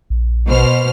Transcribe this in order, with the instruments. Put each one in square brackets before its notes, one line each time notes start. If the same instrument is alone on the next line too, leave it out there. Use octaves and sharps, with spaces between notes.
[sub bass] A#1
[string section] B2 C5 F6